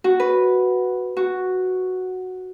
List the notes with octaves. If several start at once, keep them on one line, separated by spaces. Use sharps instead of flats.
F#4
B4
F#4